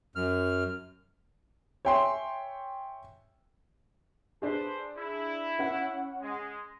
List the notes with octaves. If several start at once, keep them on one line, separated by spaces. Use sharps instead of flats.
F#2 F6
C#5 E5 G5 G#5 C6
D4 G#4 A4 B4 C5
E4
C#4 F#5
G#3